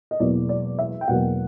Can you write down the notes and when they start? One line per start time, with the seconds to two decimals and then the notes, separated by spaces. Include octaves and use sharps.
0.11 D#5
0.20 E1 E2 B2 F#3 A#3 D5
0.49 D5
0.79 E5
1.01 G5
1.08 E1 E2 B2 F#3 A#3 F#5